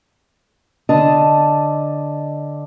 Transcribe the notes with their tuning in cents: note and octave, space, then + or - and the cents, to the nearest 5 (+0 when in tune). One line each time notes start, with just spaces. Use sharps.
D3 +0 D#5 +0 A5 +0